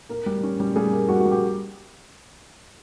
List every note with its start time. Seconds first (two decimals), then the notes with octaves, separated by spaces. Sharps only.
0.09 A#3 A#4
0.26 G3
0.43 C#4
0.60 G3
0.76 G3 G#4
0.92 A#3
1.09 G3 F#4
1.20 F#4
1.26 G3
1.31 G4